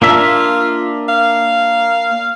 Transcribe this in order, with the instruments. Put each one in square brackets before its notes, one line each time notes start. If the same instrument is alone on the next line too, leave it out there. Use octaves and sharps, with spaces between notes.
[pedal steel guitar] A#3 D4 E5 [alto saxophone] F4
[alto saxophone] F5